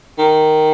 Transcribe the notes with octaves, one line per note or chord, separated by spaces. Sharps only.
D#3